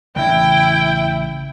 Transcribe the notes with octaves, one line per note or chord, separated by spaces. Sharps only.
A1 C#3 E3 E4 G5